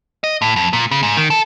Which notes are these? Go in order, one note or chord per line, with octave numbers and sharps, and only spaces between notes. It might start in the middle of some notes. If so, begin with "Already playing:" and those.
D#5
A2
F2
A#2
C#3
G#2
D#3
A4